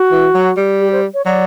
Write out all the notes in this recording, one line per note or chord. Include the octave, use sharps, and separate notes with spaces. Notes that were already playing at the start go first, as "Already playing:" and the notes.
Already playing: F#4
E3
F#3
G3
G4
C5
C#5
F#3 D5